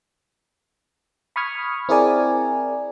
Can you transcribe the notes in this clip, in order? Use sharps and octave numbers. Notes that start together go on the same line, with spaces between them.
B5 C#6 D#6 F6 G#6
C4 E4 G#4 A#4 D5 G#5